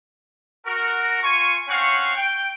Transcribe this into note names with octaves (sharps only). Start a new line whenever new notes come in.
F#4 A#4
F4 G#5 C#6
C4 C#4 C#5 F5 F#5 C#6
G5